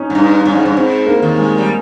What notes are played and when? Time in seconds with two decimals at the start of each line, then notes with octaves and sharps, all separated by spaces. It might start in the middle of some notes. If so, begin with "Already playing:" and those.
Already playing: C#4 D#4
0.10 G#2
0.15 G2 D#4
0.45 G2 C#4
0.55 G#2
0.65 G2
0.77 G#2 C4
1.07 A#3
1.22 D#2 D#3
1.38 G#3
1.58 G3